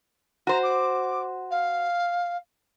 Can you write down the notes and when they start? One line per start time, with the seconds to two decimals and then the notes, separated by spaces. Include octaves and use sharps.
0.47 F#4 C5 A#5
0.62 D6
1.50 F5